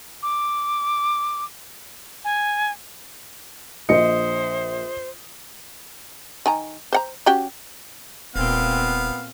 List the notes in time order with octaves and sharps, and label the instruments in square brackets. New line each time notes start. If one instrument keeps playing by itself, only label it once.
[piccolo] D6
G#5
[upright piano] A#1 C#7 [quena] C5 [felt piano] D#5
[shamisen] D#3 G#5 A#5
C5 F#5 A#5
C#4 F#4 G4
[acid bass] D#1 [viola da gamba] A#2 C4 [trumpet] B3 [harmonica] F5